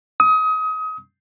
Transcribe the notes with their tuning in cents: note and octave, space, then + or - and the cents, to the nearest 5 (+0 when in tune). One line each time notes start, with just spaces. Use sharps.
D#6 +30